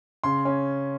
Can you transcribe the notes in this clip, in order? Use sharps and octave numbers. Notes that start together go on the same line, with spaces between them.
C#3 C6
C#4